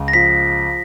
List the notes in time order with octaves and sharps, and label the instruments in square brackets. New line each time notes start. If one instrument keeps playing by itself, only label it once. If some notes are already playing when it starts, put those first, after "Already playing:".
Already playing: [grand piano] C#2
[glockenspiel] A#6
[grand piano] F3 [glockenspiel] B6